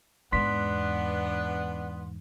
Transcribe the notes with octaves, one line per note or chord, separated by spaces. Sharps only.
E2 G#2 B3 D4 C6 B6